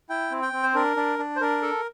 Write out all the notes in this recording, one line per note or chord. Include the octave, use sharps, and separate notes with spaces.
E4 G5
C4
G5
C4
C5
D4 A#4
D4
D4
C5
D4 A#4
A4